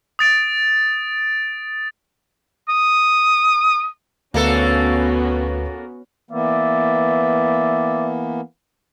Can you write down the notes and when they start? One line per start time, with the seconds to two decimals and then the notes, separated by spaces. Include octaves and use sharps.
0.19 D#6 A6 D7
2.69 D#6
4.34 D2 A#3 B3 C#4 F#4 A4 B4
6.31 E3 A#3 B3 D5 E5